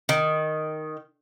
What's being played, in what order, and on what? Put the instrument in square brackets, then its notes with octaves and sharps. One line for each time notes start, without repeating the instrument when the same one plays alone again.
[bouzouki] D#3